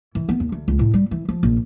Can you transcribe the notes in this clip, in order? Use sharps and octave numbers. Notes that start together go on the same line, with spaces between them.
E3
B3
D#2
D2
C#2
A2
G3
E3
F3
A#1